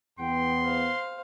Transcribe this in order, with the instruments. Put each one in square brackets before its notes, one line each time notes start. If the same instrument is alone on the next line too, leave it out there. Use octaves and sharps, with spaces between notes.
[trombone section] E2 B3 [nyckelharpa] G5 [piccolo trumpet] C6
[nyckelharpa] C5 F5